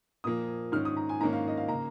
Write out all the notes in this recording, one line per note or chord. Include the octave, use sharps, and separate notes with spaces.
A#2 F3 A#3 D#6
G#2 D#3 C#4 F6
D#6
A#5
G#5
G#2 D#3 A#3 C#4 A#5
F5
D#5
F5
C#3 A#3 A#5